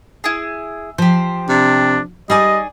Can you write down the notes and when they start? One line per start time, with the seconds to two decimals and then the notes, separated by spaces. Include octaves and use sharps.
0.24 E4 G#4
0.98 F3 G4 C5
1.49 C3 D4
2.30 G3 D#4 G#4 D5 D#5 G#5